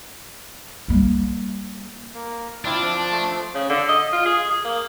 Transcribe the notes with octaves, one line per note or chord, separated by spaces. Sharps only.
G3 A#3
A#3
C4 D4 E4 F4 F5
F3
A3 C6
C#3
D3
D#5
F4
G#4
G#4
A#3